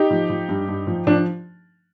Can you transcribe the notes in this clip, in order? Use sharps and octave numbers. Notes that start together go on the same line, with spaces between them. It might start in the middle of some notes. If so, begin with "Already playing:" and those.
Already playing: D#4 G4
F3
F3
G2
G2
F3
F3 D4